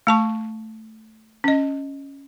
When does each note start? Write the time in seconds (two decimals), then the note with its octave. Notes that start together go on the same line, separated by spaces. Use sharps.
0.07 A3 A5 C#6
1.44 C#4 D#5